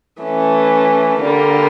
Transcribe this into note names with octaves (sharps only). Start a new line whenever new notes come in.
E3 A3 C#4
D3 G3 A#3